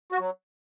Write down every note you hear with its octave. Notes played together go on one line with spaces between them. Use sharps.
F#4
F#3